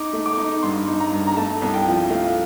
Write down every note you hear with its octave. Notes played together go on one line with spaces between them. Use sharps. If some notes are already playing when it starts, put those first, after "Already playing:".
Already playing: D#4 D6
A3
D6
D#4
G2 C6
D#4
A#5
G2
A#5
A3 A5
C2
G5
F3
A3 F5